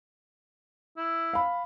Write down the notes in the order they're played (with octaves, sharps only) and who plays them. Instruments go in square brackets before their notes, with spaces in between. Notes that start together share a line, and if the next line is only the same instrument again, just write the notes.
[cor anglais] E4
[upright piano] F5 B5